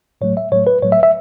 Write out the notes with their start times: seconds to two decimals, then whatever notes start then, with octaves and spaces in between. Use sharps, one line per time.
0.21 A2 F#3 A3 C#5
0.37 E5
0.52 A2 F#3 A3 C#5
0.67 B4
0.82 A2 F#3 A3 C#5
0.92 E5
1.03 E5